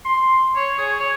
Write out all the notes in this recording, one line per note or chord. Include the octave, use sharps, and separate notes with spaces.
C6
C#5
G#4
C#5